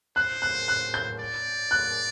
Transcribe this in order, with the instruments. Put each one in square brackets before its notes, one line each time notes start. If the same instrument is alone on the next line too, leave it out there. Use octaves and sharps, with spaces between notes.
[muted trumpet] C5 [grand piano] F#6
[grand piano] F#6
F#6
G6
[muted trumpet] D5
[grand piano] F#6